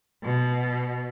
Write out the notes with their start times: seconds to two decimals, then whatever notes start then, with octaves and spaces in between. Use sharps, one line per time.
0.24 B2